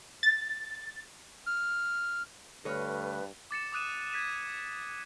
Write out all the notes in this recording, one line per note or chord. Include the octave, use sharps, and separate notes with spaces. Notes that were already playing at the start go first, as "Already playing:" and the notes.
A6
F6
D2 G2 A4 B4 C#5 C#6 F6
D6 A6 C#7 E7
D6 D#6 F#6 D#7 E7
G#6 B6 D#7 E7